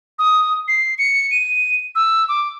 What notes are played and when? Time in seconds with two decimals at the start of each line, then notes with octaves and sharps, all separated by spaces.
0.19 D#6
0.68 C7
0.98 C#7
1.31 D#7
1.95 E6
2.29 D6